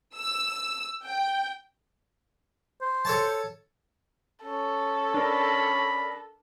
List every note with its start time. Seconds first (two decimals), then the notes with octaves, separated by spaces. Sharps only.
0.16 E6
1.03 G5
2.81 C5
3.05 A4 C#5 A5
4.44 C#4 A4
5.14 D4 A#4 B5